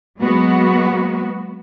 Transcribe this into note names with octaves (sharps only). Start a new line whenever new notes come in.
F#3 G#3 A#3 B3 F#4